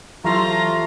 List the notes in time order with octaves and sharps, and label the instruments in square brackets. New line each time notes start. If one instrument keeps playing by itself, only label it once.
[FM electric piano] E3 F#3 G4 [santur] A3 C5 [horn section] F4 [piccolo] A#5